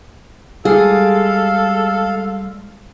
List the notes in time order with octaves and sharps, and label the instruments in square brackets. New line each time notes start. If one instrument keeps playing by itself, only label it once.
[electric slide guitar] G3 G#3 [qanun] G#4 [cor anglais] A4 [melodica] F5